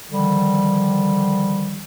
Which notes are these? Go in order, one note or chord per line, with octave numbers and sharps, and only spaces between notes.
D3 D#3 F3 G3